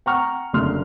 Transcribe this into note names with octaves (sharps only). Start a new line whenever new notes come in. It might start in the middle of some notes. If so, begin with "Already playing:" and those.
F#5 G5 A#5 C#6 F6
F#1 D3 C6 F6